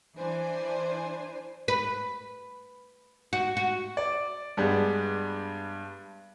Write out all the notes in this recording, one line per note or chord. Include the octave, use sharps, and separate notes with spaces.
E3 D4 C5 G#5
B4
F#4
F#4
D5
G2 G3 G#3 B3 D4